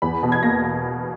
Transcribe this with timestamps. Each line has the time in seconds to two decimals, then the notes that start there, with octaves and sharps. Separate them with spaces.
0.02 E2 B5
0.23 B2
0.32 G#6
0.43 A#3 A#6